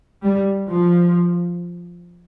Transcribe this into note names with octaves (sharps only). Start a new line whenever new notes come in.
G3
F3